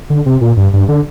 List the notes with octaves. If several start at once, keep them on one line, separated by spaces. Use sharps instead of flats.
D3
C3
A#2
G2
G2
D3